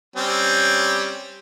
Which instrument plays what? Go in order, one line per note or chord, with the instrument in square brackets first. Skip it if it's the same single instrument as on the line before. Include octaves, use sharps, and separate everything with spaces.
[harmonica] G3 C4 C#4